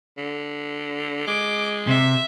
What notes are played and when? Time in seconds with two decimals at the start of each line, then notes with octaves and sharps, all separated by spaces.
0.18 D3
1.27 G#3 D6
1.87 C3 E5